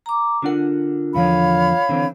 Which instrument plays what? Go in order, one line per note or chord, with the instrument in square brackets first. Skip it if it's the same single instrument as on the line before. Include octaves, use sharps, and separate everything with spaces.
[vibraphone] A#5 D6
[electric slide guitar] D3 D4 F#5 [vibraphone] F4 A#4
[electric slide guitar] E2 D3 F3 [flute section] C#5 F5 B5
[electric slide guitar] D3 E3 C4